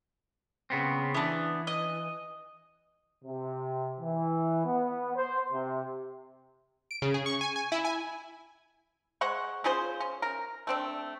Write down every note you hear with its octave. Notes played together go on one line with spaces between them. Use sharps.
C#3 B3 C4
E3 B3 D4
D#5
C3
E3
B3
C5
C3
D7
C#3
G#4
C#6
G#5
G#5
E4
G#5
G#3 C5 F#5 C#6
C#4 F4 G#4 C5
C#4
A#4
A3 C4 D4